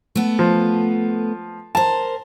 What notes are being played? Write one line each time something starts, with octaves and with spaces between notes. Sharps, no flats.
A3 B3
F3
A#4 C5 A5